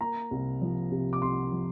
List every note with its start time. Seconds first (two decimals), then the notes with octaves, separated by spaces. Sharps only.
0.01 A#3 A#5
0.31 C2
0.62 F3
0.91 C3
1.13 D6
1.22 C2 C6
1.52 F3